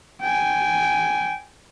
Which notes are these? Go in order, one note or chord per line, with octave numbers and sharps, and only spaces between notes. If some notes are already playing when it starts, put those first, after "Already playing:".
G5 G#5